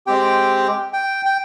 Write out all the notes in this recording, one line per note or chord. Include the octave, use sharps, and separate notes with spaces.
G#3 C4 G4 G5
G5
G5